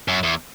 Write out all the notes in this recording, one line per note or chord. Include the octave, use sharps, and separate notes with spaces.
F#2
E2